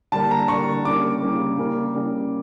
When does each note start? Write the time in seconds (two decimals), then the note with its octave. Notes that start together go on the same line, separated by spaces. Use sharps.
0.12 D3 G3 A#3 A5
0.31 A#5
0.48 D3 G3 A#3 C#6
0.85 C#3 G3 A#3 D6
1.22 C#3 G3 A#3
1.58 C#3 G3 A#3
1.94 C#3 G3 A#3